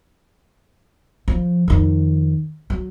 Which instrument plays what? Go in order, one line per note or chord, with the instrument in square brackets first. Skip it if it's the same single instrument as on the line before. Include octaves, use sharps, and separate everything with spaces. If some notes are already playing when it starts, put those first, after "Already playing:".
[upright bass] F3
F2 D#3
F#3